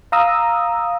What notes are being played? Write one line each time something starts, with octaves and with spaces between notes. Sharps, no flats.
F5 A#5 D#6 E6